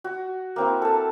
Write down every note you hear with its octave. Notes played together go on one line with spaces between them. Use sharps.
F#4
A#3 C4 E4
A4 A5